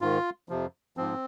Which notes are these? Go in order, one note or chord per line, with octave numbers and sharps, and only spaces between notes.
G#2 D#3 F4
F2 C3 F3
G#2 F3 C4